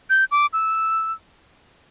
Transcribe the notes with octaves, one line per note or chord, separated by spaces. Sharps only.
G6
D6
E6